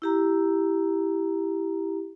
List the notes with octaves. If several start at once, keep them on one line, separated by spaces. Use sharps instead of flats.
E4 G4 A#5